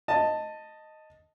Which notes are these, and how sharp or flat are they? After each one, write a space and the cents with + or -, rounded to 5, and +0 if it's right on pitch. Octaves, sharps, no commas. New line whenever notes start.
D#5 +0 A5 +10